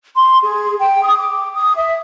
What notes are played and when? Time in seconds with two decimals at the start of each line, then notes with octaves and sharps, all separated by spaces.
0.16 C6
0.44 G#4
0.80 G5
1.04 D#6
1.19 D6
1.55 D#6
1.77 E5